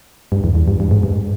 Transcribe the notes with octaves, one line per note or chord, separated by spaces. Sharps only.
G2
E2
E2
G2
G2
G#2
G2